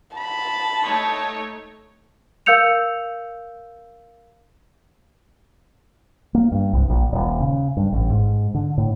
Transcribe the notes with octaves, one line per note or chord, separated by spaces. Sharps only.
A5 B5
A3 D#4 C#5
A#4 F5 E6 G6 C#7 F7
A#3
G2
C2
A#1
D#1
C#3
G2
A1
G#2
D3
A2